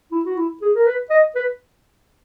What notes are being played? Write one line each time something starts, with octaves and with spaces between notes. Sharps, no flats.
E4
F#4
E4
G#4
A#4
B4
D#5
B4